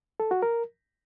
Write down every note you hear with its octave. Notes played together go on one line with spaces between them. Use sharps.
A4
F#4
A#4